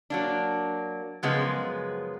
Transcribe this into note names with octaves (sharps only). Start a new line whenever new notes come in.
F#3 A#3 D4
F#2 C#3 F3 G#3 B3